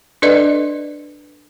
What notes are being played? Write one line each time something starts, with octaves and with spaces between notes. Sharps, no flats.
D4 A4 B4 D5 D#5